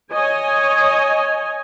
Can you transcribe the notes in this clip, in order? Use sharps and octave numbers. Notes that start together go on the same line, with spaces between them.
C#5 D#5 G#5